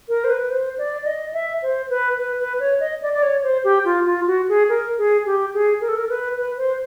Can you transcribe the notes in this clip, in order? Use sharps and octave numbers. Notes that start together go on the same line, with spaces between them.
A#4
C5
B4
B4
C5
D5
D5
D#5
E5
C5
B4
B4
B4
C#5
D#5
D5
D5
C#5
C5
G4
F4
F4
F#4
G#4
A#4
G#4
G4
G#4
A#4
A4
A#4
B4
B4
C5